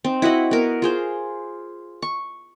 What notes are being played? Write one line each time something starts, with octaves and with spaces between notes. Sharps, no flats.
C4 D#4
E4 F#4 D#5 F#5
B3 A#4
F4 G#4 C5
C#6